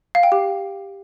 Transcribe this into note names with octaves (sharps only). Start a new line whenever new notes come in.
F5
G5
G4